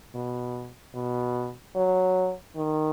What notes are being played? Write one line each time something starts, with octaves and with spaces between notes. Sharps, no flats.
B2
B2
F#3
D#3